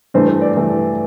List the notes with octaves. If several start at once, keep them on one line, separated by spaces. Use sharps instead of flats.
G2 E3 A3 C5
C5
D5
G2 E3 A3